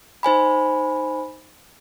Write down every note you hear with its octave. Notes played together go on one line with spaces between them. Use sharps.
D#4 C5 G#5 B5